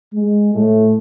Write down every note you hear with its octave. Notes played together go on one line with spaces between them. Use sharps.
G#3
A2 A3